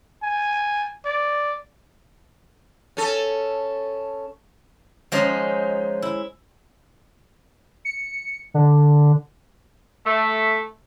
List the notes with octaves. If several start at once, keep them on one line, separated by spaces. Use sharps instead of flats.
G#5
D5
C#4 A4
F3 G#3 C#4 D#4
E4
C#7
D3
A3